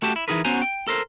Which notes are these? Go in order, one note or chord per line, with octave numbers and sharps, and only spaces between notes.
A3 F#4 G4 A5
E4
E3 F3 D#4 G#4 A#4 B4
B3 C#4 F#4 C5 G#5 A#5
G5
A4 A#4 C5